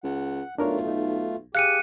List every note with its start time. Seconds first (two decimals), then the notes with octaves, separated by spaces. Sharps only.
0.04 C#2 F#5
0.58 B1 A3 D4 F4 A#4 C#5
0.87 D#4
1.55 G4 G#4 F5 G5 F#6 C#7 D#7